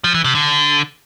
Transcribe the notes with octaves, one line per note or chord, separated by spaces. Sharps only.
F3
E3
C3
D3